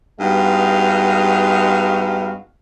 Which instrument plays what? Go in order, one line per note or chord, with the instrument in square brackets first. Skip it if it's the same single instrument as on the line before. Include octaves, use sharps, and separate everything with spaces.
[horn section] G2 G#3 B3 D#4 F#4 F5